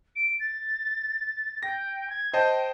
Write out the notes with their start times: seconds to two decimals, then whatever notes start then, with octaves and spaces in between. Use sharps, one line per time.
0.16 D7
0.40 A6
1.63 G5 A#6
2.10 G#6
2.34 C5 D#5 G5 A5